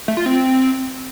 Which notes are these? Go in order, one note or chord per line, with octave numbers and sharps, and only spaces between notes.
A3
F4
C4